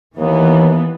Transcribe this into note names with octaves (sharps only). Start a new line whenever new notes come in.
D#2 E3 B3